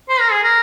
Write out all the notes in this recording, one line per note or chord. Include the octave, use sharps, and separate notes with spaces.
C5
A#4
G#4
A#4